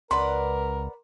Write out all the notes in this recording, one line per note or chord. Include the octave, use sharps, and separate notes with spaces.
C#2 A#4 B4 D5 F#5 C6